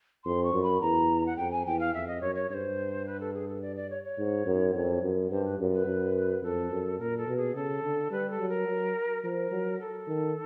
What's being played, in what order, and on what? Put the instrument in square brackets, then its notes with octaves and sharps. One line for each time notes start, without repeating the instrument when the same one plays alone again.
[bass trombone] F2 [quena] C6
[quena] C#6
[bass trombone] F#2
[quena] B5
[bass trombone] E2 [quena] A#5
[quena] F#5
[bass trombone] F2 [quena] G5
[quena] G#5
[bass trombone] E2 [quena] G5
[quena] F5
[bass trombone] F2 [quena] E5
[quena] D#5
[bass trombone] F#2 [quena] C#5
[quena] C#5
[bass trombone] G2 [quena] C5 C#5
[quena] B4
A4
G#4
A4
D5
D5
C#5
C#5
[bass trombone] G#2
F#2
F2
F#2
[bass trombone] G2 [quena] C5
[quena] B4
[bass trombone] F#2
[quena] B4
[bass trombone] F#2
[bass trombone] F2 [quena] A4
[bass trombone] F#2
[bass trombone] A#2 [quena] A#4
[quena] A4
[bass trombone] B2
[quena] G#4
[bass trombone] C#3 [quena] A4
[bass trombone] D3
[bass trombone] G3 [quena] B4
[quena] A4
[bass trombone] F#3
[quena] A#4
[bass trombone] F#3
[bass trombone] F3 [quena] A#4
[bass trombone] F#3
[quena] A4
[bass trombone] D#3